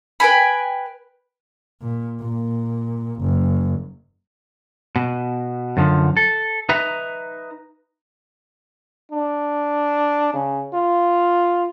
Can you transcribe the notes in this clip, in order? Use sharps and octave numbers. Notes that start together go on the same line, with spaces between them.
B4 G5 G#5 B5
A#2
A#2
F#1
B2
F#2 D3 F3
A4
D#4 B4 E5 A#5
D4
C#3
F4